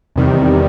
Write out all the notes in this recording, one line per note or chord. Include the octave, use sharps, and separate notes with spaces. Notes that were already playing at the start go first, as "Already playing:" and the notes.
E2 C3 D#3 G3